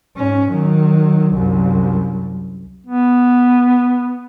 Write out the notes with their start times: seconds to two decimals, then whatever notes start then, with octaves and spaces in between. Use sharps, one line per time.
0.17 G#2 C#4
0.51 D#3 F#3
1.34 C2 F#2
2.87 B3